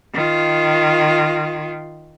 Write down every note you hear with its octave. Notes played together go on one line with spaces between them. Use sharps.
D#3 F4